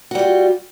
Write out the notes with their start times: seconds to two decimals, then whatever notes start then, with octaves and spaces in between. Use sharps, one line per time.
0.11 F#4
0.15 G3
0.19 F4